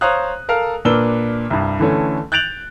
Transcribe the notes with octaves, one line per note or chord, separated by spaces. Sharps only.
C5 C#5 F5 A#5 D#6 F#6
A4 A#4 F5
A#2 D4 A#4 B4 E6 G7
C2 G2
D3 E3 A3 C#4
F#6 G6 A6 D7 F7 F#7